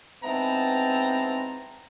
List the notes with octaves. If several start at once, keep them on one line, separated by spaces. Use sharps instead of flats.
G#2 B3 C4 E4 A5 A#5